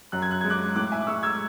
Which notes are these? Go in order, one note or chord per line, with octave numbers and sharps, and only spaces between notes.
F#2 F#6
G#6
F#6
G#3 G#6
D6 F#6
A2 D6 F#6
E5 G#5
D6
G#3 C#6 E6
E6 G#6